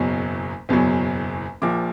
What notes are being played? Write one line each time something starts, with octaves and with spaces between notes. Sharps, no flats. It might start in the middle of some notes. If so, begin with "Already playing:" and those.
Already playing: F#1 E2 B2 F#3
F#1 E2 B2 F#3
A#1 A#2 F3 D6